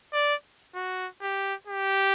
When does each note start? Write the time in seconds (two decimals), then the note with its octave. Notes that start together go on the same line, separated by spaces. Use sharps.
0.13 D5
0.75 F#4
1.22 G4
1.67 G4